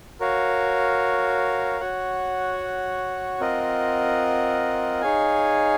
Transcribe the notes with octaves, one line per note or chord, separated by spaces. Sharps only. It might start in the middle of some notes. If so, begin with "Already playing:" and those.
F#4 A#4 C#5 F5
F#4 C#5 F#5
C4 F4 A#4 D#5 F#5
D#4 G#4 C#5 F5 G#5